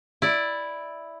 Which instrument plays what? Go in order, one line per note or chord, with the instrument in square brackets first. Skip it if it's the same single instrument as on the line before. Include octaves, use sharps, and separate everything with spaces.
[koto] E4 D5